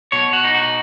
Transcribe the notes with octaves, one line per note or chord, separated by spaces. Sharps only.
B2 C#5
F#4
D#4
F#4